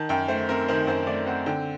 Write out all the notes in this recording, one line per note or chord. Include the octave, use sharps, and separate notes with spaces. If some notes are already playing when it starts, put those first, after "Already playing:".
Already playing: D#3 A5
F#2 G5
A3 C5
C4 A#4
D#3 C5
F#2 C5
A3 D5
C4 F#5
D3 G5